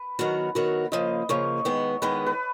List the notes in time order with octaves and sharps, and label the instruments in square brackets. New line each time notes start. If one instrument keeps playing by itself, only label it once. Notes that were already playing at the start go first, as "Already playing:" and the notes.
Already playing: [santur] B4
[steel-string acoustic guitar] D#3 F#3 B3 F#4 A#4
D#3 F#3 B3 F#4 A#4
[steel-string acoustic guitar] C#3 F3 A#3 [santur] D#5
[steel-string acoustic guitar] C#3 F3 A#3 [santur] C#5
[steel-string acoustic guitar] D#3 G#3 B3
[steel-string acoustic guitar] D#3 G#3 B3 [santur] B4
[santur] B4